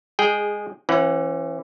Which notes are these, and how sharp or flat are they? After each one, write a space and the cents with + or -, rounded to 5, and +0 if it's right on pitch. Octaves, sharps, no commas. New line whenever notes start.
G#3 -15 G#4 +0 G5 +0
E3 +20 C#4 -30 F#5 +0